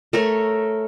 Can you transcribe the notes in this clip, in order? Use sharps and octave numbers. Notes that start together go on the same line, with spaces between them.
A3 A#4 C#5